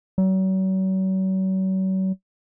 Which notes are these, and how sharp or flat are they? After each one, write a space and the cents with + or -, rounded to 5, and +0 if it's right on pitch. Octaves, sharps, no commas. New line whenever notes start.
F#3 +40